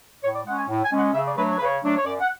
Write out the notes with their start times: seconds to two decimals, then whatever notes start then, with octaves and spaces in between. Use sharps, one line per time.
0.23 A2 C#5
0.33 D5
0.45 G#3 C#4 F#5
0.57 G#5
0.68 A2
0.83 G#5
0.91 G#3 C#4
0.99 F#5
1.13 C#3 E5
1.25 D5
1.36 F#3 A3 D4 B4
1.48 C#5
1.56 C#3 B4
1.64 C#5
1.82 F#3 A3 D4
1.96 C#5
2.04 F#2 D5
2.20 F#5